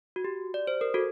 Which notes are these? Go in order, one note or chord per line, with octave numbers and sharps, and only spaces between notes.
F#4
G4
D5
C5
A#4
F#4 A4